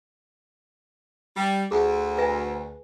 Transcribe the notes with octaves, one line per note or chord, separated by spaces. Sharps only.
G3
D2 G#4
B4 E5 G#5